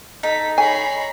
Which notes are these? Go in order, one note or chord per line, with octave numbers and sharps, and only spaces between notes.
D#4 A4 B6
C#5 G#5 A#5 B5 C7